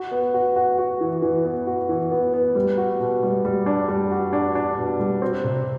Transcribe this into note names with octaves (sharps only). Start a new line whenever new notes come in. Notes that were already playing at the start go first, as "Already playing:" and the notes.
Already playing: F#4
B3
F#4
F#4
F#4
E3
E3
B3
F#4
E3
B3
B3
G3
F#4
B2
G3
G3
D4
G3
F#4
D4
D4
B2
G3
C4
C3